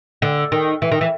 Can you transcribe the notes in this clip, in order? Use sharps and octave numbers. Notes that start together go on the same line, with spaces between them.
D3
D#3
E3
D#3
E3